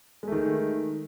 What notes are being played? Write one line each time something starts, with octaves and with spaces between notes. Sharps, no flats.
D#3 G#3 A3